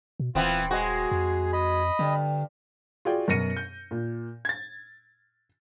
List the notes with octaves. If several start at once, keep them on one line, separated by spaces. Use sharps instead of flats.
B2
D#1 E3 B3 C4 F4
G#3 F#4 G#4
F2
D#5 B5
G2 D3
F4 F#4 G#4 D5 G5
F#2 B2 A#4 A#6 C#7 D#7
G6
A#2
G#6 A6